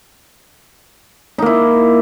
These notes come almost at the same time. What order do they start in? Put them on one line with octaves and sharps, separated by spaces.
D#4 A#3 E4